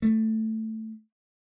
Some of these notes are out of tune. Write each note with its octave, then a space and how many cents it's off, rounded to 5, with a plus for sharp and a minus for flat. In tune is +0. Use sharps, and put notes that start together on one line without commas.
A3 +5